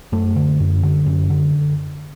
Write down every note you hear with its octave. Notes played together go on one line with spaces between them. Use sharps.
F#2 A3
D3
F#2
D3
F#2
D3